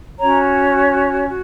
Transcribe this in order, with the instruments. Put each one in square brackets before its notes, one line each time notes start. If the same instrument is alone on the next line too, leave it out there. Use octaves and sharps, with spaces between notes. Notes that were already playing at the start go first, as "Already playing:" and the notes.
[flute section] C#4 F#4 C#5 A#5
F#4